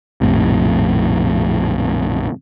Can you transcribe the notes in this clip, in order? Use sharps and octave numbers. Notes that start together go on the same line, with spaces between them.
A#1 F2 A2 C3